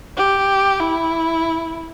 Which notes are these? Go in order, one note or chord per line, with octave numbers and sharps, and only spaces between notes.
G4
E4